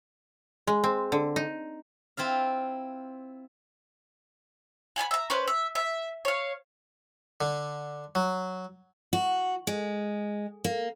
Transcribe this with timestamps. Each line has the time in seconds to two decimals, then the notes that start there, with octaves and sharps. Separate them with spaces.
0.67 G#3
0.84 C4
1.12 D3
1.36 D#4
2.17 C4 E4 F4 F5
4.96 F#5 G#5 A5 B5
5.11 E5 A#5
5.30 C#4 B4 C5
5.48 E5
5.75 E5
6.25 C#5 F5
7.41 D3
8.15 F#3
9.13 F#4
9.67 G#3
10.64 A#3